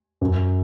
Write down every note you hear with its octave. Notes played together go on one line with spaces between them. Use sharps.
F#2